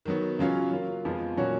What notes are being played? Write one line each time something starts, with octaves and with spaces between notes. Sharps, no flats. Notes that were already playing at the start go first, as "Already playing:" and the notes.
D#3 F#3 B3
C#3 F#3 C#4 F4
F#3 A#3 F4
F2 F3 G#3 B3 F4
A#2 F#3 C#4 F#4 C#5